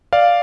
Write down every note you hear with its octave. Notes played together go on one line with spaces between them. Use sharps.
D5 F5